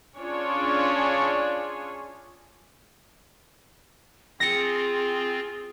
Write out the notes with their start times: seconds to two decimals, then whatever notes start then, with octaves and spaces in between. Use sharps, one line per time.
0.18 C#4 D4 F4 G#4 C#5
4.40 C4 F4 G#4 A#6 C#7